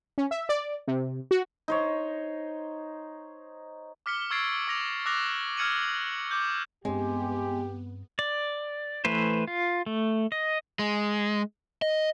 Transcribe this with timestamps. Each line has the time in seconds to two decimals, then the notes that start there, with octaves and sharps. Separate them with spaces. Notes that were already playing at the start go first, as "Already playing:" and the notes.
0.18 C#4
0.31 E5
0.49 D5
0.87 C3
1.31 F#4
1.68 D#4 C5 C#5
4.06 D6 F6 B6 C#7 G7
4.31 C#6 E6 G#6 A6 C7 D7
4.68 D6 A#6 F7
5.06 D6 E6 F#6 A#6 F7
5.57 E6 F6 G#6 C#7 D#7 F#7
6.31 D6 G6
6.85 G2 G#3 B3 C4 G4
8.19 D5
9.05 E3 A3 B4 C5
9.48 F4
9.86 A3
10.32 D#5
10.79 G#3
11.82 D#5